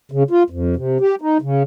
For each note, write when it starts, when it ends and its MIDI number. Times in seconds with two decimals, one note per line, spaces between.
0.12 0.23 49
0.31 0.43 65
0.50 0.75 41
0.76 0.98 48
1.00 1.15 67
1.22 1.38 63
1.42 1.63 49